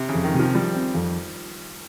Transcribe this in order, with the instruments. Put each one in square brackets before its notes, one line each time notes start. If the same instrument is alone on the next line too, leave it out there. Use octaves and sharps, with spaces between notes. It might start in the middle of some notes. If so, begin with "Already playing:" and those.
Already playing: [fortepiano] C3
[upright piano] F2 [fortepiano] C#3
[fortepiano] D#3
[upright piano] C3
[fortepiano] F3
[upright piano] F3 [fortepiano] G3
[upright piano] C4
F2